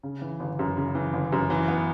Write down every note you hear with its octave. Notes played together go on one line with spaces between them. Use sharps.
C#3
E3
G1
F#2
C#3
E3
G1
F#2
E3
B3